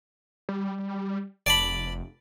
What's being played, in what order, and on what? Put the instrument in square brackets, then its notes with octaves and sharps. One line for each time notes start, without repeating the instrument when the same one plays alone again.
[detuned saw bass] G3
[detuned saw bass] F1 [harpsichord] D5 A5 B5